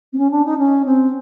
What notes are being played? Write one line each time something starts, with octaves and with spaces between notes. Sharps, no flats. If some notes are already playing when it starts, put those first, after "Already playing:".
C4
C#4
D4
D#4
C#4
C4